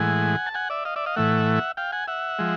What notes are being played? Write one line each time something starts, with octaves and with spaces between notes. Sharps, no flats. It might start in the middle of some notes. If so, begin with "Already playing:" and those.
Already playing: A2 E3 G#3 F#5 G#5
A5
F#5 G#5
D5 E5
D#5 F5
D5 E5
D#5 F5
A2 E3 A3 E5 F#5
F5 G5
F#5 G#5
E5 F#5
F3 G#3